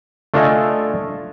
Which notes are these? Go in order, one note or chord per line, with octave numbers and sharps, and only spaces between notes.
A3 D4 F4 A4 D#5 G#5